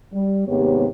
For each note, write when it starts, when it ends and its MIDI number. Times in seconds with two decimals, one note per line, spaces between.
0.13 0.45 55
0.47 0.86 39
0.47 0.86 44
0.47 0.86 48
0.47 0.86 59
0.47 0.86 67
0.47 0.86 73